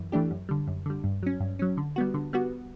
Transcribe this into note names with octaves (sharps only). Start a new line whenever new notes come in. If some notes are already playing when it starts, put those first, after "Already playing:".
Already playing: F#2 E3
E3 A3 D4 G4
F#2
D3 G3
F#2
D3 G3
G2
F#3 C#4
G2
F#3 C#4
D3
G3 B3 F#4
D3
G3 B3 F#4